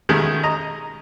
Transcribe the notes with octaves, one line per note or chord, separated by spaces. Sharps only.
B2 D#3 G#3 A3 C#4 G#4
D#5 A#5